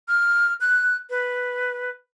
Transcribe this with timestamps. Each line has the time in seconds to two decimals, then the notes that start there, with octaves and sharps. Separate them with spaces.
0.08 F6
0.61 F#6
1.10 B4